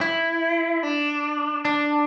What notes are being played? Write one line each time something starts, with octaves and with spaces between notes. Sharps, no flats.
E4
D4
D4